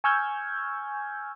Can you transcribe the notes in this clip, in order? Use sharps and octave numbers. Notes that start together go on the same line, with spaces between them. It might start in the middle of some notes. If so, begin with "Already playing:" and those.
G#5 C#6 E6 F6 G6 G#6